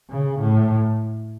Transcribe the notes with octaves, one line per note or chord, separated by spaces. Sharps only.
C#3
A2